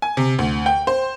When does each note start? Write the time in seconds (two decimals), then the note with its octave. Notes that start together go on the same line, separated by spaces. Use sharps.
0.02 G#5
0.17 C3
0.39 D2
0.66 G5
0.87 C5